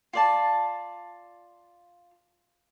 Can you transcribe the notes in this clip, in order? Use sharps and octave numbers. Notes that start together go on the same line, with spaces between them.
F4 D5 A5